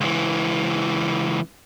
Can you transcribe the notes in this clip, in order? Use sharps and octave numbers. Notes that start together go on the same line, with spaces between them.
C#2 E3